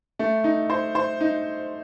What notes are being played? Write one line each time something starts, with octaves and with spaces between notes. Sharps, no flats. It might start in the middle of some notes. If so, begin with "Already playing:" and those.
A3
D#4
C5
C5
D#4